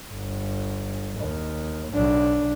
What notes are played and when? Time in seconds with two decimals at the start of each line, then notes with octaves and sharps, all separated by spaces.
0.12 G1
1.19 D#2
1.93 B1 D4